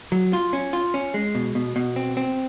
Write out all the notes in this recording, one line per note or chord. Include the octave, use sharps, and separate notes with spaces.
F#3
F4
C#4
F4
C#4
G#3
B2
B2
B2
C4
C4